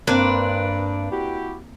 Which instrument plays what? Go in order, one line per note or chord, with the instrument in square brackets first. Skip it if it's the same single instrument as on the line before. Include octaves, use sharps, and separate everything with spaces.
[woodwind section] G2 [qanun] A#3 C4 [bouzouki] D4 B4
[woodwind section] E4 F#4 G4